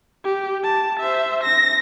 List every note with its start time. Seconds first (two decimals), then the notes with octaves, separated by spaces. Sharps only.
0.24 G4
0.64 A5
1.00 C5 E5
1.44 A#6